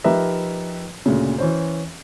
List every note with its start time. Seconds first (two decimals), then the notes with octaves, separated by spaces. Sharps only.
0.04 F3 D#4 G4 A#4 B4 E5
1.06 D2 A#2 C#3
1.38 E3 C#4 C5